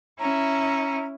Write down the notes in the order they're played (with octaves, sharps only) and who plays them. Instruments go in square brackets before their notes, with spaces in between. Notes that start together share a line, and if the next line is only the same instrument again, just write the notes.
[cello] C#4 E4 [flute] A#5